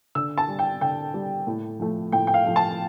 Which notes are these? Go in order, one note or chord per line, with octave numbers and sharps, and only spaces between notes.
D3 E6
A5
G3
G5
D3 G5
G3
A2
F3 A3
A2 G5
G5
F5
F3 A3
A5